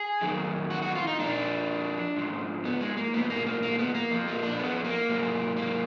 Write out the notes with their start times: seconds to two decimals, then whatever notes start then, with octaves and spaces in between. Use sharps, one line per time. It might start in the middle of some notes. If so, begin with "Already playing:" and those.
Already playing: G#4
0.21 F2 D#3 F#3
0.70 F#4
0.82 F#4
0.95 F4
1.07 D#4
1.19 F2 F3 D4
2.16 G#2 F3
2.65 B3
2.81 G#3
2.97 A#3
3.13 G#2 F3 B3
3.30 A#3
3.46 A#3
3.63 A#3
3.79 B3
3.95 A#3
4.11 F2 F3
4.28 A#3
4.43 D4
4.60 B3
4.85 A#3
5.09 G#2 F#3
5.57 A#3